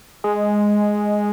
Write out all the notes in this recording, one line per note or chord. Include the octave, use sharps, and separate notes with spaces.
G#3